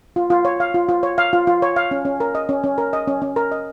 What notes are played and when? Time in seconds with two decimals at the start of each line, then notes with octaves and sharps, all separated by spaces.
0.16 F4
0.30 F4
0.45 C#5
0.60 F5
0.74 F4
0.89 F4
1.03 C#5
1.18 F5
1.33 F4
1.47 F4
1.62 C#5
1.76 F5
1.91 C#4
2.05 C#4
2.20 A#4
2.35 D#5
2.49 C#4
2.64 C#4
2.78 A#4
2.93 D#5
3.08 C#4
3.22 C#4
3.36 A#4
3.52 D#5